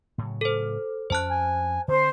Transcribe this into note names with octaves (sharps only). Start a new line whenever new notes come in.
A2 C#3 F#3
A4 C5
F2 B3 C#4 C5 A5 F#6
G#5
D3 C4 C5